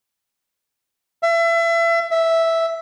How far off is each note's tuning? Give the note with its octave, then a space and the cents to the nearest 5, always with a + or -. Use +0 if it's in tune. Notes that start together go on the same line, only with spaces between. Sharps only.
E5 +30
E5 -5